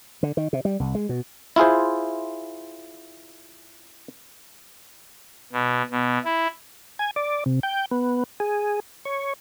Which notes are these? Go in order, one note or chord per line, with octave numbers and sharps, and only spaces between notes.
D3
D#3
C3
G3
C2
G#3
B2
E4 F4 G#4 C5
B2
B2
E4
G#5
D5
C3
G5
B3
G#4
C#5